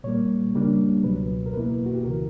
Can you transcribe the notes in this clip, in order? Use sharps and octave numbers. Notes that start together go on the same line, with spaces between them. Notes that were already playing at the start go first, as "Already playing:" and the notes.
A#2 G3 A#3 C#5
C#3 G3 A#3 D4
C#2 B2 F#3 B4
A#4
E2 B2 A#3 E4 B4
F#4
G4
C#2 C#3 E3 A#4